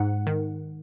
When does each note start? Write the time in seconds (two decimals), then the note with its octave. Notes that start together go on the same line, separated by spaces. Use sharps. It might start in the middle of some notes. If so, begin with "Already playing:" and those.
Already playing: G#2 F#5
0.27 D#3